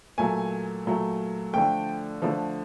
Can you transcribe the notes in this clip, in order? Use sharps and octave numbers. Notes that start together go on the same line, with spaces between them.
A#2 F#3 A3 G#5
A#2 F#3 A3
D3 F3 A3 G5
D3 F3 A3